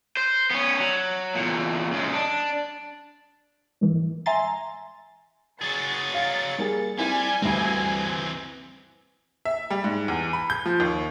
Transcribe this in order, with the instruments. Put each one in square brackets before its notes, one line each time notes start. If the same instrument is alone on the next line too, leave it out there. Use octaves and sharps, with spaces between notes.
[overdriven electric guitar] C5
B3 C#4
F#3
E2 A#2
F#2 G#3
D4
[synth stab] G#2 E3
E5 G#5 A#5 C6 A6
[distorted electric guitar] F#3 G#4 [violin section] A6 C#7
[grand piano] F5
G3 A#3 G#4
[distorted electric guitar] G3 [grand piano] C4 E4 [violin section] G#5
[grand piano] D2 G2 [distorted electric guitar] E3 C4
[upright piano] E5
G3
G#2
E2
B5
G6
F3
D#2